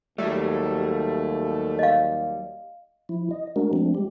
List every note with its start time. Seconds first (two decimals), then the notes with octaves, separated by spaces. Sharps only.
0.18 D#2 F#3 G3 A3
1.79 D#5 F5
3.09 F3 E4
3.31 D#5
3.56 G#3 A3 C#4 D4 F#4 A#4
3.73 F3 G#3 A3 C4 D4
3.95 G3 G#3 G4